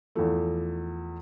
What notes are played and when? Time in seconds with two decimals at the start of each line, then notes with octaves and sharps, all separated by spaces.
0.15 E2 F3 A3